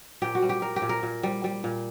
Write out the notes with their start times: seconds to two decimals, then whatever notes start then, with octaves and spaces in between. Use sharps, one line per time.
0.22 A#2 G4
0.35 F#4
0.42 G3
0.49 G4
0.62 G3 A#4
0.76 G4
0.82 A#2
0.89 A#4
1.03 A#2
1.23 G3
1.44 G3
1.64 A#2